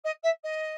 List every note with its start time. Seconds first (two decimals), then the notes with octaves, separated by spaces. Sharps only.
0.04 D#5
0.23 E5
0.43 D#5